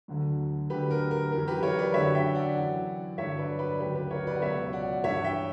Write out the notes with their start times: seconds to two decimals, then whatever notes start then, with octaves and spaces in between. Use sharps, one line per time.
0.08 D2 D3 F#3
0.69 D2 D3 F#3 G4 B4
0.91 A#4
1.11 A#4
1.32 F#2 E3 A#4
1.48 G4 B4
1.63 A#4 C#5
1.78 B4 D5
1.94 F#2 D3 F#3 C#5 E5
2.15 E5 G5
2.35 D5 F#5
2.56 F#2 E3
3.18 G2 D3 F#3 C#5 E5
3.38 B4 D5
3.59 B4 D5
3.80 D2 C#3 F#3 G4 B4
3.95 G4 B4
4.11 A#4 C#5
4.27 B4 D5
4.35 F#5
4.42 C#2 B2 F#3 C#5 E5
4.73 D5 F#5
5.04 G2 E3 C#5 E5
5.24 E5 G5